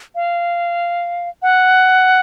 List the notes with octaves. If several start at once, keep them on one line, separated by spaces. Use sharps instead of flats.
F5
F#5